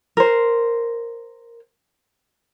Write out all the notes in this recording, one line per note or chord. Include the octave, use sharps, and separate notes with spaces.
A#4 C5